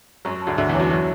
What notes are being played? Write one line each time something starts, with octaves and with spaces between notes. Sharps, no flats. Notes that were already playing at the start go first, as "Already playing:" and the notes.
F#2 F#3 C#6
A5
D2 D3
D2 D3 E5
E2 E3
C#5
F#2 F#3
F#3 C#6